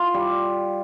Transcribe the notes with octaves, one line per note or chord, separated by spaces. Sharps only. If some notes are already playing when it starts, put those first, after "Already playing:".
Already playing: F4
G3 G4